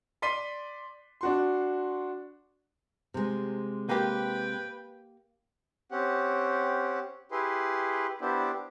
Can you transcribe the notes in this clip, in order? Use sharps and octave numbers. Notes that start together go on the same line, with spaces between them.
D5 C6 B6 C7 D#7 G7
D4 F#4 C6
C3 G#3
A#3 G4 B4 G5
C4 C#4 G4 F#5
E4 G4 G#4 B4 C6
B3 D4 E4 G4 C5